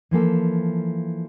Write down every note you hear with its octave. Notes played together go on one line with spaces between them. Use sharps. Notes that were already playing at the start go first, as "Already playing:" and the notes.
E3 F3 A#3 A4